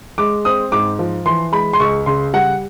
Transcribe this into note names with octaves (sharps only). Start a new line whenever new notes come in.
G#3 D6
C4 D#6
G#2 D6
F3
E3 C6
G#3 B5
C6
C#2 C#6
C#3 C6
G3 F#5